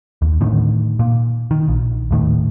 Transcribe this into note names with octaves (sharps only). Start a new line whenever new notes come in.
D#2
A2 D3 D#3
A#2
D#3
A#1
D#1 A2 D#3